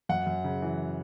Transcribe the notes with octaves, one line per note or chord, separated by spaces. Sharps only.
F#2 F#5
F#2
C#3
E3